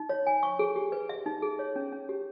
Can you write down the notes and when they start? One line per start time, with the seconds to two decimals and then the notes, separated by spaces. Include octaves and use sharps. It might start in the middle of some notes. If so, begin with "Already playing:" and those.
Already playing: D#4
0.09 C#5
0.27 G#5
0.43 C#6
0.59 G#4
0.76 G4
0.92 B4
1.09 E5
1.26 D#4
1.42 G#4
1.59 C#5
1.76 C#4
1.92 C#4
2.09 G4